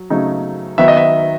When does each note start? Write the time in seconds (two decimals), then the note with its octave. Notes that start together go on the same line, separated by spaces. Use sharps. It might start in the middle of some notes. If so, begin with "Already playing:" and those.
Already playing: F#3
0.10 C#3 F#3 A3 D#4
0.78 D#3 F#3 B3 D#4 E5
0.88 D#5
0.97 E5